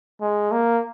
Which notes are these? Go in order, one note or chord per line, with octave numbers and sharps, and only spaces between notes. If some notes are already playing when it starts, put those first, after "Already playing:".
G#3
A#3